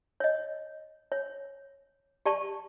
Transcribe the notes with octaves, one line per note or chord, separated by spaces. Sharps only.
C#5 D#5
C#5
G4 D5 A5 C#6